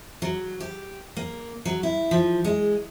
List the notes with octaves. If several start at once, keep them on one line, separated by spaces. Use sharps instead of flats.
F#3
G4
A#3
F#3
E4
F3
G#3